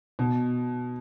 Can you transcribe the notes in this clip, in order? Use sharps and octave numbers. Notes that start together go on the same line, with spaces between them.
B2